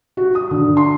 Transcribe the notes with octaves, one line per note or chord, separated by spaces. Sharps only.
F#4
D#6
D3
C6